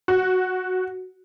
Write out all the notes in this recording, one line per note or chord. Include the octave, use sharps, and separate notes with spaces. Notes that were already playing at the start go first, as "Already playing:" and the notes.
F#4